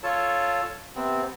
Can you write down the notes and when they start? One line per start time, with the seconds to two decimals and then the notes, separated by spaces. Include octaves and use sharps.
0.03 F4 A4 C#5 A5
0.96 C3 B3 C4